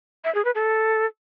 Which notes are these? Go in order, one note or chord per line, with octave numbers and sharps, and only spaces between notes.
E5
G#4
B4
A4